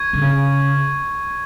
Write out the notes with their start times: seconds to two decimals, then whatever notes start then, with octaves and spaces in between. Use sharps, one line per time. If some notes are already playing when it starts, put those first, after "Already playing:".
Already playing: C#6 G#6
0.13 D3
0.21 C#3